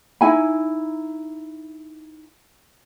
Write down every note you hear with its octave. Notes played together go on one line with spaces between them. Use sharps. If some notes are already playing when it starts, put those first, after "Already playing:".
D#4 E4 G#5 B5